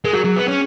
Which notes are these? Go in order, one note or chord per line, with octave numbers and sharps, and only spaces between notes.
G#3 A#4
F#3 G#4
F#3
B3
C#4